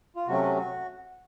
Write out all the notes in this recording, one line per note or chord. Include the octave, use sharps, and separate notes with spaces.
F4
C3 F#3 A3 C#4 F#4
F#4